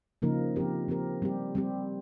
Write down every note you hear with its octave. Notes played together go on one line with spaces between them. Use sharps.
C#3 F3 A#3 D#4 A#4
F3 C4 G4 A#4
F3 C4 G4 A#4
G3 C4 G4
G3 C4 G4